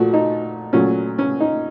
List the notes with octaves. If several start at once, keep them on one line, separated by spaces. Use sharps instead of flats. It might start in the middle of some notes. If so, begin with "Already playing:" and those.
Already playing: A#2 F3 A3 F#4
D#4
A#2 F#3 A3 C#4
C#4
D#4